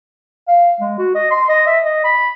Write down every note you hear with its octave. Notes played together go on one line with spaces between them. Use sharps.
F5
G#3
F#4
D#5
C6
D#5
E5
D#5
B5